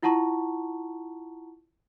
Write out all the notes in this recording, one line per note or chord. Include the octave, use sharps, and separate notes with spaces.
E4 F4 F#5 A5 A#5 C#6